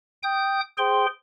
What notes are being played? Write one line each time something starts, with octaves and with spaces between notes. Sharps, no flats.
G5 D#6 G6
G#4 C5 G5 C6